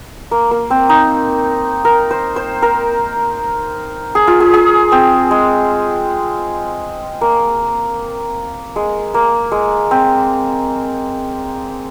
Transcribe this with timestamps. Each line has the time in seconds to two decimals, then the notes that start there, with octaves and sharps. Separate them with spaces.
0.31 A#3
0.51 A#3
0.70 C4
0.89 D#4
1.85 A#4
2.11 C5
2.36 C5
2.62 A#4
4.15 G#4
4.27 F4
4.40 G#4
4.54 G#4
4.92 C4
5.31 G#3
7.21 A#3
8.76 G#3
9.14 A#3
9.52 G#3
9.91 C4